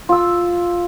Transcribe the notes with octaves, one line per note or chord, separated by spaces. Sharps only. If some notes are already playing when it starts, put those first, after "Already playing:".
F4 E6